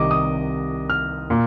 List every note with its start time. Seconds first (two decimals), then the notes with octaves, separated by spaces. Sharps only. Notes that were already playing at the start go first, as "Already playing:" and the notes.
Already playing: C2 C3 D#3 D#5 D6
0.11 D#6
0.90 F6
1.30 A#2